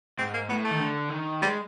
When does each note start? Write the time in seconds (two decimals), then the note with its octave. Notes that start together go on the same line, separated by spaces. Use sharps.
0.18 G#2 C4
0.34 A#3
0.49 A2 B3
0.65 A3
0.71 D#3
0.80 D3
1.10 D#3
1.42 G3 G#3